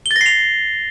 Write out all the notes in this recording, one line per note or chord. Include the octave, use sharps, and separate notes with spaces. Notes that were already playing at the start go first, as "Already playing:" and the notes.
G7
A6
A#6
C7
F7